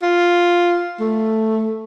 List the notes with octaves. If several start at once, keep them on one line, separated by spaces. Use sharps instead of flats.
F4
A3